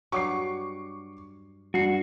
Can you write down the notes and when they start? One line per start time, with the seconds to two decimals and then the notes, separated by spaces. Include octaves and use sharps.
0.12 G2 F#3 B4 C#6 D6 C7
1.74 G2 F#4 C7